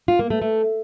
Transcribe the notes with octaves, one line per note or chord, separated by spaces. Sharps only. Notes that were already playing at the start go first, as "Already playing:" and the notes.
F4
A#3
A3
A3